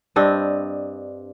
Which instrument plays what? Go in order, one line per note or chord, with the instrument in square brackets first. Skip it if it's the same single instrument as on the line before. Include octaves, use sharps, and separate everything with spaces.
[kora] G2 C4 D4 D#5